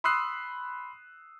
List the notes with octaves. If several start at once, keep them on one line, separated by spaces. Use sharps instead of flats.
B5 C6 D#6 E6 F#6 C7